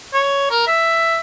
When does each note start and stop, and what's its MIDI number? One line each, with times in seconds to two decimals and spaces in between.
0.14 0.47 73
0.51 0.67 70
0.68 1.20 76